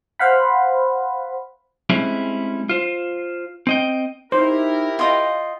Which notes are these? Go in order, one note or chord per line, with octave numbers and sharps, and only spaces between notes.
C5 F5 F#5 B5
G3 G#3 C4 C#4 E4
F4 C5
C4 D#5 G5
D#4 E4 G4 A#4 C5
F4 D#5 F5 G5